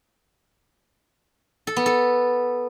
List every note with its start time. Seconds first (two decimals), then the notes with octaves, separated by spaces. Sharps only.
1.67 A4
1.77 B3
1.86 A4